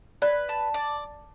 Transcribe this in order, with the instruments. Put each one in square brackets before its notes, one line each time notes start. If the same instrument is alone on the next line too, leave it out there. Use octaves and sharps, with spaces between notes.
[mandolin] B4 [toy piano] D5
[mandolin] A5
D5